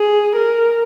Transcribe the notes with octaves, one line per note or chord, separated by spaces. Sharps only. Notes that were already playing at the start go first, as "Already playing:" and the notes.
Already playing: G#4
A#4